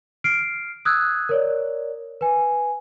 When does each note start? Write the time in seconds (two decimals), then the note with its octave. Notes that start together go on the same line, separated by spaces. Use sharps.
0.24 F6 C7 D7
0.85 D#6 E6 F#6 G#6
1.29 A#4 C#5 D5
2.21 B4 G#5